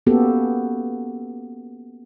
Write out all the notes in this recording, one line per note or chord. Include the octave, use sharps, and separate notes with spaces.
A#3 B3 C#4 F#4 G4 A4